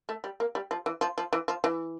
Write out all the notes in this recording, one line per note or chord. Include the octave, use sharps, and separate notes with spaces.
A3
G3
A#3
G3
F3
E3
F3
F3
E3
F3
E3